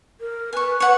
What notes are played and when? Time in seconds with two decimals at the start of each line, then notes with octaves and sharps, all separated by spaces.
0.21 A#4
0.53 B4 G#5 C#6
0.80 B4 C#5 F#5